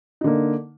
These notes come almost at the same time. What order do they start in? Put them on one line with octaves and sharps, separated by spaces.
D#4 D3 A#3